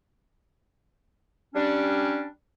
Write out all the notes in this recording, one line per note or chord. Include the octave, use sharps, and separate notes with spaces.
G3 C#4 D4